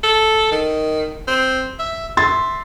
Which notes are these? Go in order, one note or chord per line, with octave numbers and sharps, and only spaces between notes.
A4
D#3
C4
E5
E5 C6 A6